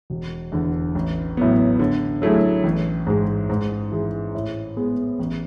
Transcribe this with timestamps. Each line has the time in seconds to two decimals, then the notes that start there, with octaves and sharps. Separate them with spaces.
0.10 E1
0.52 E2 D3
0.95 A1
1.37 A2 F#3 B3
1.80 D3
2.22 F#3 A3 E4 G#4
2.64 A1
3.07 G#2 G#3
3.49 G#2
3.92 E3 G#3
4.35 A2
4.77 G#3 B3
5.20 A1